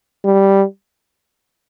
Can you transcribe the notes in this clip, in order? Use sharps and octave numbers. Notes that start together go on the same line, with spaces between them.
G3